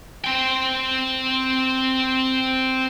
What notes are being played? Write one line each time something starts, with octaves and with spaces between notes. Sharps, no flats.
C4 G5